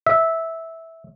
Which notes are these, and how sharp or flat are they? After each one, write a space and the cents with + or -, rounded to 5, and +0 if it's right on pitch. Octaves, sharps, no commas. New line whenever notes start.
E5 -10